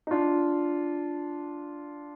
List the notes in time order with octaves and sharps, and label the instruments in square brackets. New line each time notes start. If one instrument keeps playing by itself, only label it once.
[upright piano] D#4
D4 F4